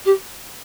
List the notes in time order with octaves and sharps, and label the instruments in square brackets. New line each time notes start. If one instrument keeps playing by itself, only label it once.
[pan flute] G4